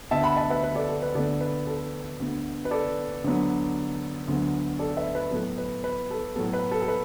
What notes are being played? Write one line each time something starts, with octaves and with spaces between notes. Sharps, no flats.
D2 D3 B3 E5 A5
F#5 B5
E5 A5
B4 E5
B4
A4 D5
A4
B4
D2 D3 B3 A4 D5
B4
A4
D2 D3 B3
B4
A4 D5
D2 D3 F#3 B3
D2 D3 F#3 B3
A4 D5
B4 E5
B4
A2 F#3 B3 A4
B4
B4
A4
A2 F#3 B3 A4
B4
A4
A4
B4